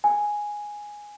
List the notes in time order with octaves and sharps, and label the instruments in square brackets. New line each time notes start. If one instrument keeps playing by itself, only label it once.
[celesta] G#5